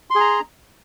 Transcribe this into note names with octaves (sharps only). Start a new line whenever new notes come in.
G#4 A#5 C6